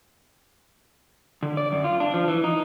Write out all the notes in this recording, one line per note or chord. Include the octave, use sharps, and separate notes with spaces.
D3
D5
F#2
F4
D4
F3
E3
D#4